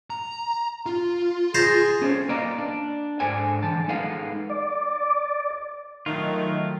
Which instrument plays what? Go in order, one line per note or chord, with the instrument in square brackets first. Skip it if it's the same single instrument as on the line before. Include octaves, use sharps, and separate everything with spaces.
[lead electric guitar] A#5
F4
[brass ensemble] G#4 [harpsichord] C5 A5 A#5
[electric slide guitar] C#4 A4 C5 C#5
A#3 B4 D5 D#5 F5 A#5
D4
G#2 D4 A4 C5 G#5
D3 E3 A5
G#3 D#4 A4 B4 F5 F#5
[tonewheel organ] D5
[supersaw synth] D#3 [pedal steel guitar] F#3 A3 F4